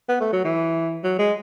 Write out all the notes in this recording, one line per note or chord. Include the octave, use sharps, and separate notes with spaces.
B3
A3
F#3
E3
F#3
G#3